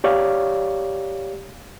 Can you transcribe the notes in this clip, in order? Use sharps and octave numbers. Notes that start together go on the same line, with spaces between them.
G4 C#5 D5 F5